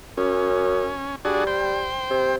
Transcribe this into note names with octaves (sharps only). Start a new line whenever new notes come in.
F#2 C#4
G3 D4 F#4 G#4
C5 G5
C3